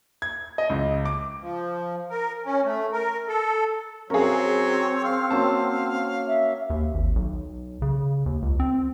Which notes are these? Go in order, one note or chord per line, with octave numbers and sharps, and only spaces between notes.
G#6
D#5
C#2
D6
F3
A#4
C#4
A3
A#4
A4
F#3 C4 C#4 G#4 A#4 C#5
F5
A#3 C#4 F#4 A5
E5
D#2
G#1
B1
C#3
D#2
C#2
C4